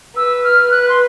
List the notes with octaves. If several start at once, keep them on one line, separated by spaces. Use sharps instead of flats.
B4 E6
F6
B4 F#6
C6